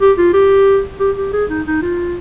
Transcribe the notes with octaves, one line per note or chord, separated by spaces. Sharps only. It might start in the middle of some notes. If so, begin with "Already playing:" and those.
G4
F4
G4
G4
G4
G#4
D#4
D#4
F4